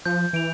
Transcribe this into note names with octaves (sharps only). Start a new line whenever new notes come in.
F3 G6
E3 D7 F7